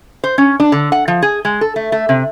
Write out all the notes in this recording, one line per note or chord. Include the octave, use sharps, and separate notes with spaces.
C5
C#4
D4
D3
F#5
F3
G#4
G#3
A4
A3
A3
C3